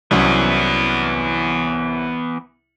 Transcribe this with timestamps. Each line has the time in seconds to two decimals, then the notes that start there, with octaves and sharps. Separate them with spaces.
0.11 C2 E3 F#3 B3 C#4